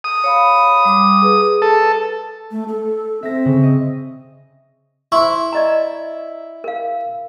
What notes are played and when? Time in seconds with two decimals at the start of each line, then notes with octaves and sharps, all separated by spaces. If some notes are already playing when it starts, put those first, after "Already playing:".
0.04 D#6
0.24 C#5 F5 B5
0.85 G3 D6
1.22 G#4 B4
1.62 A4
2.51 A3
2.68 A4
3.23 C4 E5 A#6
3.45 C#3
3.63 D#5
5.12 E4 C5 C6 C#6
5.53 D5 D#5 A#5
6.64 A#4 F5